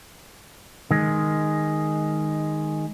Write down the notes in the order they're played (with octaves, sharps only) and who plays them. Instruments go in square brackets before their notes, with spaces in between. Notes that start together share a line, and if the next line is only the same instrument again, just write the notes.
[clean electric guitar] D#3 G#3